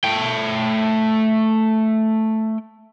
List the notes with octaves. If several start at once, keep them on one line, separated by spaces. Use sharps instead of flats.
A3 G5